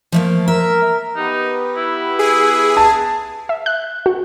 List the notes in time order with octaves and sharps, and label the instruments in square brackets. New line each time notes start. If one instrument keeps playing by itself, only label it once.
[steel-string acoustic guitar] F3 A3 A#3
[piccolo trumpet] A#4 [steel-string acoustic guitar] E5
[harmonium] B3 G4 B4 [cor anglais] D#4
[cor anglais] E4
[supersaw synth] G#4
[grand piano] A5
[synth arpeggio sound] E5
F#6
F#4